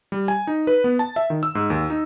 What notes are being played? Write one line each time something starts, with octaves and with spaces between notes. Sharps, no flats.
G3
G#5
D#4
B4
B3
A5
E5
D#3
E6
G#2
D#2
D#4